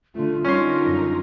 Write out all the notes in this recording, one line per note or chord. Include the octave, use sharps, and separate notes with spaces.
D3 A3 F4
D3 G3 C#4 D#4 A#4 C6
F#2